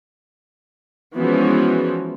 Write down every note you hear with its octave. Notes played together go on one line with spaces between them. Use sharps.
E3 F3 G#3 B3 C#4 F#4